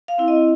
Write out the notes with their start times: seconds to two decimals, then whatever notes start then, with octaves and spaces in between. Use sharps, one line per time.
0.08 F5
0.18 C4 E4
0.28 D#5